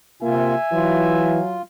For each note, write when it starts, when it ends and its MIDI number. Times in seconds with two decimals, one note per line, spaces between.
0.22 0.55 48
0.22 0.55 58
0.22 0.55 65
0.22 1.45 76
0.22 1.45 80
0.72 1.39 52
0.72 1.61 54
0.72 1.62 65